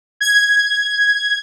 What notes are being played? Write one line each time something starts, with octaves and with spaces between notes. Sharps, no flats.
G#6